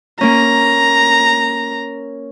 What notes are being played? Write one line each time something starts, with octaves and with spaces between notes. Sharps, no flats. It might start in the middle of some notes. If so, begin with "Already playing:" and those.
A#3 C#4 A#5